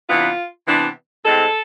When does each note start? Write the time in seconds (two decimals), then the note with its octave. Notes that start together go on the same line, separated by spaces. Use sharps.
0.08 C3 E3 B3 D4 F4
0.67 C3 E3 B3 D4
1.24 A2 G#3 C4 A4